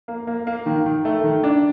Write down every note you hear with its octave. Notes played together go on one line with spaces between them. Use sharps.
A#3
A#3
A#3
D#3
D#3
A3
D#3
D4